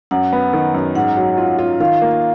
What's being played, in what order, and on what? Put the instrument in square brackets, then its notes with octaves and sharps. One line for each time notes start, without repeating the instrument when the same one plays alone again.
[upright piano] F#2 [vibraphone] F#5
[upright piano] B3
D#3
F#2
[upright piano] G#2 [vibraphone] F#5
[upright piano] F#3
F4
F4
[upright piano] D#3 [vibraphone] F5
[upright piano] A#3